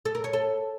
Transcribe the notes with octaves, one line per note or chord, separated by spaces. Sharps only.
A4
A#4
C#5
A4